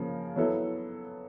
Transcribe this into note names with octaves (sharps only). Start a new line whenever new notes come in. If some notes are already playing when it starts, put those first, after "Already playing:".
Already playing: C#3 F3 A#3 C#4
F#3 B3 E4 A4